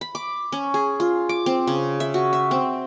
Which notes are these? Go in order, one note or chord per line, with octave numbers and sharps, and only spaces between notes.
B5
D6
C#4
G#4
F4
D6
C4
C#3
E5
F#4
E5
C4